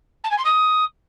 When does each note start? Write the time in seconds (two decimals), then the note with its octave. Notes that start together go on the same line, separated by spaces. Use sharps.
0.24 A5
0.31 G#5
0.38 C6
0.45 D#6